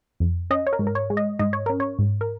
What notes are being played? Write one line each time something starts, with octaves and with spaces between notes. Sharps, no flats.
F2
C#4 D#5
C#5
A#4
G#2
A#4
C#5
G#3
D#5
G#2 D#5
C#5
C#4 A#4
C#5
G#2
A#4